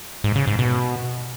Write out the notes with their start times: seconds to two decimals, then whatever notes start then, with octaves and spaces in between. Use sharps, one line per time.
0.24 G#2
0.36 C#3
0.47 G#2
0.59 B2